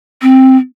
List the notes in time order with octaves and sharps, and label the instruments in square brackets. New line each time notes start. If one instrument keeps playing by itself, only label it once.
[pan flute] C4